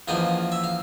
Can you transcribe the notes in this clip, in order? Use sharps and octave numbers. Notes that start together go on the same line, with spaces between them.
E2 C#3 F3 A#3 D#5 F5
E5
F5